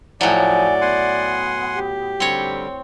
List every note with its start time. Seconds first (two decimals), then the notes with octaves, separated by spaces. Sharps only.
0.21 A2 F3 F#3 D5 G#5
0.81 B3 F#5 G#5 C6
1.75 G4
2.20 D3 G3 C4 C#5